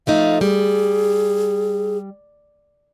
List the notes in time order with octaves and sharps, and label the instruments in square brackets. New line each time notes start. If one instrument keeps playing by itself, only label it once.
[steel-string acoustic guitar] F3 A3 D#4 [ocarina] F5
[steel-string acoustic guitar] G3 [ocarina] G#4